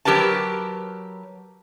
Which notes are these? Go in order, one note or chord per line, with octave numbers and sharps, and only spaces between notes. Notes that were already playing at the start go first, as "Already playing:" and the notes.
F#3 G4 A#4 B4 A5